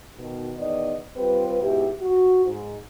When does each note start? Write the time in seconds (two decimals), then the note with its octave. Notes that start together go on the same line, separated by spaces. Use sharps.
0.18 B2 D#3
0.56 E2 D#3 B3 D5 D#5
1.17 G3 C4 F4 G4 B4
1.61 G#2 B2 E4 G4
2.01 F#4
2.45 G#2